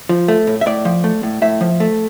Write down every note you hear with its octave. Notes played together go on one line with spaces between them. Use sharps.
F3
A3
A2
E5
A2 D5
F3
A3
A2
A2 E5
F3
A3